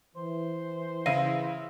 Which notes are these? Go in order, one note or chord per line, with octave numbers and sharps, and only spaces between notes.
E3 C5
C#3 E4 F5 A#6 D#7